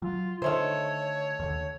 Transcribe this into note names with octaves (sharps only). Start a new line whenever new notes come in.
F#3 F4
D3 D#3 A3 C5 C#5
D#2 D3